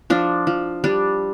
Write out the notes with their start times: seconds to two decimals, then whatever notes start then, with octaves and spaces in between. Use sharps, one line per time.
0.10 F3 D4
0.47 F3
0.84 G3 D4